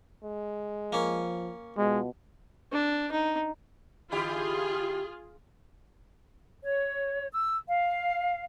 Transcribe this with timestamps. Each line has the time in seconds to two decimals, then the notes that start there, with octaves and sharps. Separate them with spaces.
0.24 G#3
0.93 F3 A#3 C#4
1.77 B2 G#3 F4
2.72 D4
3.12 D#4
4.12 D3 E4 F4 G4 G#4
6.64 C#5
7.32 E6
7.67 F5